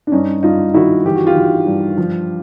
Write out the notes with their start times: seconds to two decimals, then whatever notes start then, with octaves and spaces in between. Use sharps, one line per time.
0.07 D4
0.12 G2 C#4 D#4
0.43 G2 D#4 F4
0.74 D#3 E4 F#4
1.05 E3 G4
1.16 F#4
1.27 F4 G4
1.36 E3
1.67 G2
1.98 F3